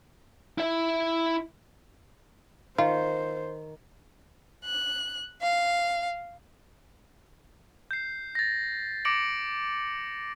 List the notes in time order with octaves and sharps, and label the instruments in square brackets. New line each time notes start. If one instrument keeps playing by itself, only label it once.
[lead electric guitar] E4 E5
[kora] D#3 [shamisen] F4 [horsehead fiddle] C5
[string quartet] F#6
F5
[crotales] G6 C7
A6 A#6
D6 A#6 C#7 D7 F#7